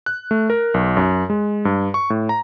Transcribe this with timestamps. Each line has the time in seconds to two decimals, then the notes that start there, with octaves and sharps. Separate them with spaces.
0.06 F#6
0.31 A3
0.50 A#4
0.74 B1
0.97 F#2
1.30 G#3
1.65 G2
1.94 C#6
2.10 A2
2.29 A#5